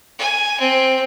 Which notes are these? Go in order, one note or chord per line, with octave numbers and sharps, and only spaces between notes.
G#5
C4